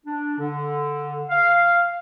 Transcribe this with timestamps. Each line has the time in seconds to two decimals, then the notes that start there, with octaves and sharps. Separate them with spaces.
0.05 D4
0.38 D3
1.30 F5